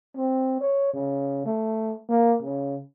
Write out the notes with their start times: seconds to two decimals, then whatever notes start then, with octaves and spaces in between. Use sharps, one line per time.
0.17 C4
0.61 C#5
0.93 C#3
1.46 A3
2.09 A#3
2.42 C#3